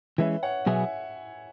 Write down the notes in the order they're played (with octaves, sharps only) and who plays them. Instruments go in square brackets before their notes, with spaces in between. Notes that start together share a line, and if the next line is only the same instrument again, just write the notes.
[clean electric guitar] E3 G#3 C#4 [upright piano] B4 E5
[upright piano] C#5 F#5
[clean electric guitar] B2 F#3 B3 G#4 [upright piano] E5 G#5